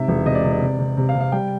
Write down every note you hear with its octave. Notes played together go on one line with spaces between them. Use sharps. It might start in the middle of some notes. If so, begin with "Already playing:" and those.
Already playing: G#2 C3 E5
E1
C3 D#5
D5
C3
D5
C3
C3
C3
F5
C3
F5
G3 G5